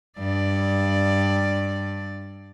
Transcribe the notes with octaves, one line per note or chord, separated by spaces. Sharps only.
G2 D5